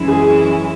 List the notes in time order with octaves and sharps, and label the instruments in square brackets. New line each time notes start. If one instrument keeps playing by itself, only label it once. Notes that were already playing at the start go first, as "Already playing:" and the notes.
Already playing: [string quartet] F#2 E3 G#3 C#4 E4
[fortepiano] G#4